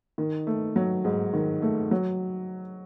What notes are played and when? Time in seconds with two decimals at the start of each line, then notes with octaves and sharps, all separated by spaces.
0.18 D#3
0.47 A3
0.76 F#3
1.05 G#2
1.34 D#3
1.62 A3
1.91 F#3